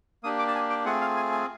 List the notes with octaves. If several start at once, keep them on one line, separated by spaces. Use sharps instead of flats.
A#3 D4 G4 D#6
D6
A5
G#5
G5
A3 C4 F4 G#4 F#5
F5
G#5
G#5